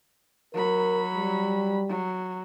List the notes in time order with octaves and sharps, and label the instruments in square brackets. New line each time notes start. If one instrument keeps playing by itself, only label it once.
[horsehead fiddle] F#3 B5 [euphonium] A#4
[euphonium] G3
[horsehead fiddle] F#3